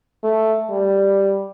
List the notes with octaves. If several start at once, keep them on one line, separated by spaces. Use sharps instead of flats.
A3
G3